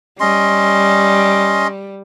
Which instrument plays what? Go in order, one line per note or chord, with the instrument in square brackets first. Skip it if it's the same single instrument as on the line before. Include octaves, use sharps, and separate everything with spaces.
[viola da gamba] G3 [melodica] C#4 D#5 C6